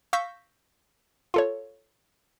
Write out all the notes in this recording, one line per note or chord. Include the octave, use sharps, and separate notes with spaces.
F5 C#6 E6 G6 A#6 B6
F4 A4 C#5